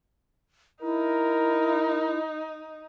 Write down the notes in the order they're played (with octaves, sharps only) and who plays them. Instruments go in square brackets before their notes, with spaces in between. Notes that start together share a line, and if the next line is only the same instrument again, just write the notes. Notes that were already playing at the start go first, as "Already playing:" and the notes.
[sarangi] D#4 [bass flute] E4 [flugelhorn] A#4